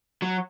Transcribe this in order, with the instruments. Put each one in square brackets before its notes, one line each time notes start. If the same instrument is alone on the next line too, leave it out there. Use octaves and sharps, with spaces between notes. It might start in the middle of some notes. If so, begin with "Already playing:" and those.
[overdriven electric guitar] F#3